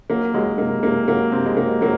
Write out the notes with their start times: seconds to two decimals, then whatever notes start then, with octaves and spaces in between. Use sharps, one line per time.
0.10 F#3 A#3
0.34 F#3 G#3
0.58 C3 A#3
0.83 C3 A#3
1.08 F#3 A#3
1.32 C3 C4
1.46 G#3
1.57 F#3 A#3
1.81 F#3 A#3